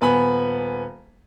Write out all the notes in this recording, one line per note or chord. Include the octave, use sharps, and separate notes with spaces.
D#1 B3 G#5 B5